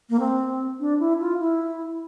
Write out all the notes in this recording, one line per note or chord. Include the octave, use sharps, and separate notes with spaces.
A#3
C4
D4
E4
F4
E4